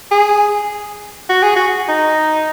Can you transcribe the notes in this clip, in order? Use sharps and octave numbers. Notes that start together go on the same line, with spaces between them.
G#4
F#4
G#4
F#4
D#4